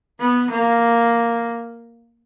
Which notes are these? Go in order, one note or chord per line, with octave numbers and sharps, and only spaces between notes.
B3
A#3